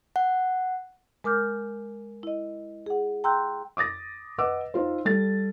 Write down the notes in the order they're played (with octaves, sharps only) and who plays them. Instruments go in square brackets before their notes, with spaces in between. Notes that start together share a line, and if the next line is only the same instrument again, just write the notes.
[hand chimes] F#5
[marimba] G#3 A#4 D6 F6 G6
E4 D#5
G#4 F#5
G5 A#5 C6 E6 F#6 G6
[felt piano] D6 D#6 A6 A#6
B4 D#5 F#5 D6 E6
D#4 F4 C5
G3 A4 A6